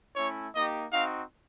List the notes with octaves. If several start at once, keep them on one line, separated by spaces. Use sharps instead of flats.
A3 C#4 E4 C#5
A#3 D#4 G4 D#5
C4 D#4 F#4 F5